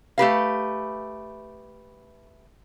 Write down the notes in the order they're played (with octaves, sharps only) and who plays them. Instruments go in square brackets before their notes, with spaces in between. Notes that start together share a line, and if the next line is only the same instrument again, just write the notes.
[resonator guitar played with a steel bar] A3 G4 B4 F5